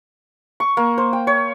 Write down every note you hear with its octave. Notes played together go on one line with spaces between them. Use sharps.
C#6
A#3
C5
G5
C#5